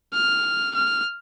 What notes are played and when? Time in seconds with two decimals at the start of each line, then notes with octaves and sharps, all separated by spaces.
0.14 F6
0.75 F6